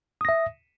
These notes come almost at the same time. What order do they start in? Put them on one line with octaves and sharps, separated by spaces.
D#6 A#6 E5